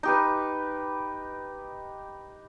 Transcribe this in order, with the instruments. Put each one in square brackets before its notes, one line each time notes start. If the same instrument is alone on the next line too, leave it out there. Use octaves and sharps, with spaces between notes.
[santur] D#4 G4 B4